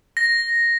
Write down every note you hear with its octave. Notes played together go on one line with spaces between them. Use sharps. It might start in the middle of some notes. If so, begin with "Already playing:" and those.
A#6